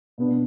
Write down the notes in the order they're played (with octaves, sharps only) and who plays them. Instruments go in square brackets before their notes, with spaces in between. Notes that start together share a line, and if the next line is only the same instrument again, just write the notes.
[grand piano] B2 B3 D4